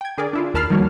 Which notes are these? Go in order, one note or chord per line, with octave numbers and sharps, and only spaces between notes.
G5 G#6
D3 G#4 A#4 D5
D4 E4 F4
D#2 A#4 A5 B5 F6 C7
D#3 F3 G3 A#3 F#4 C#5